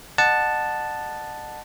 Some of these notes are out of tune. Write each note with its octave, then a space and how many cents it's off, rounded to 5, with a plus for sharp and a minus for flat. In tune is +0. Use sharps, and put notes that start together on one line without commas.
D#5 -40 F#5 -5 A5 +0